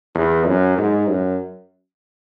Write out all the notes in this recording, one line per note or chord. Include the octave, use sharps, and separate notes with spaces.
E2
F#2
G#2
F#2